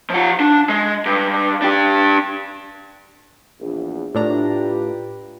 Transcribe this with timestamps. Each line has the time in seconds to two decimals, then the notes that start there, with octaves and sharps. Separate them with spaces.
0.10 F3 F#5
0.40 D4
0.69 G#3
1.05 G2
1.62 D4 G4
3.60 A#1 E2
4.15 A2 D4 F4 G4 B4 A#5